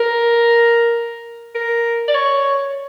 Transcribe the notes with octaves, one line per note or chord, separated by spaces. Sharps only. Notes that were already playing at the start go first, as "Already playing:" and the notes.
Already playing: A#4
A#4
D5
C#5